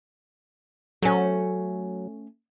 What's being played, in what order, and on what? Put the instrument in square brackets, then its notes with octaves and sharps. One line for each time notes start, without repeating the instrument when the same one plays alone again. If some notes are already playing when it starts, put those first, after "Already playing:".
[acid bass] F#3 [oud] A3 C#4